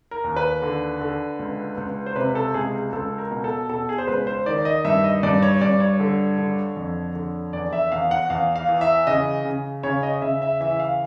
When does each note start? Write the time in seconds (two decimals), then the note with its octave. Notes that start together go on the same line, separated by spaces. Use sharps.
0.11 A#4
0.24 D#2
0.36 B4
0.62 D3
1.01 D3
1.39 C#2
1.77 C#2
2.06 C5
2.16 C3 B4
2.35 A4
2.54 C#2 G#4
2.93 C#2 A4
3.18 A#4
3.31 B2
3.44 A4
3.69 B2 A4
3.89 G#4
3.98 C5
4.08 C#2 B4
4.27 C5
4.46 D#3 D5
4.65 D#5
4.85 G2 E5
5.04 D#5
5.23 G2 D5
5.43 C#5
5.61 G2 D5
5.80 C#5
6.00 D3
6.38 D3
6.77 F2
7.15 D3
7.53 E2 D5
7.73 E5
7.92 E2 F5
8.11 F#5
8.30 E2 F5
8.56 F5
8.69 E3
8.81 E5
9.07 C#3 D#5
9.45 C#3
9.83 C#3 C#5
10.03 D#5
10.22 C#3 E5
10.42 E5
10.60 E3 E5
10.80 F5